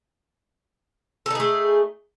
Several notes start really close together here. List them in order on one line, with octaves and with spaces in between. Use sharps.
A4 D#4 G#4 A3